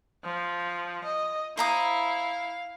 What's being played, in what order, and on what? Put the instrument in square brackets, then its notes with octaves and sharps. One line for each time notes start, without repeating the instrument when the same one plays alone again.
[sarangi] F3
D#5
[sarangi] E4 [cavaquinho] C5 A#5 D#6 [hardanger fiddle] F5